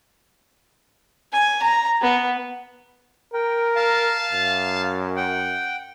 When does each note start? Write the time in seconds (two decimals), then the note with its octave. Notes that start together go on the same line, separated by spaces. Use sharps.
1.33 G#5
1.63 A#5
2.01 B3
3.34 A#4 G5
3.76 F5 A5
4.32 F#2
5.16 F#5 G5